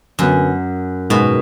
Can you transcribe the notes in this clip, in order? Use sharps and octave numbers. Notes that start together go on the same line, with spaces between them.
F#2 D3 F#3 B3
G#2 B2 D#3 G#3 B3